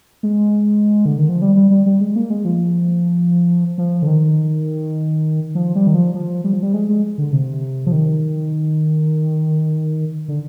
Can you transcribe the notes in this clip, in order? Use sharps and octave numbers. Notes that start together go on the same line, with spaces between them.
G#3
D3
D#3
F3
G3
G3
G3
G3
G#3
A#3
G#3
F3
F3
D3
D#3
F3
G3
D#3
F3
F3
G3
F3
G3
G#3
G#3
D3
C3
F3
D#3
D3